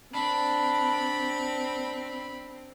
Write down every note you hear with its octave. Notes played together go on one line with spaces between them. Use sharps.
C4 D4 B5